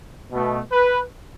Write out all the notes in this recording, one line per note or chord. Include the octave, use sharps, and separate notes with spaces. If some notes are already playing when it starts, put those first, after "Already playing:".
B2 A3
B4